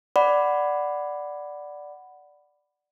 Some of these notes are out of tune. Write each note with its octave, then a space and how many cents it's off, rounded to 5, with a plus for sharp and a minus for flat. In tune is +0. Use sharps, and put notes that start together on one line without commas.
D5 +0 F#5 +0 B5 +5